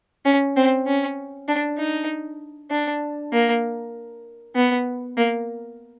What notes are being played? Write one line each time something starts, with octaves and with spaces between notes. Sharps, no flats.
C#4
C4
C#4
D4
D#4
D4
A#3
B3
A#3